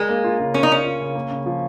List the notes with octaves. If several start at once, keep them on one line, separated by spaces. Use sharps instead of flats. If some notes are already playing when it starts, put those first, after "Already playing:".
Already playing: G#3 A#4
A#3
F4
C#3
C#4 A#4
D#4
A#3 C#4
F4
C#3
A#3
C#3
F3